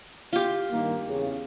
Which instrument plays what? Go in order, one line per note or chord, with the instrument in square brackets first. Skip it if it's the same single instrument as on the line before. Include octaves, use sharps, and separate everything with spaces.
[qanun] F4 G4
[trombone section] G2 D#3 A#3
E2 C#3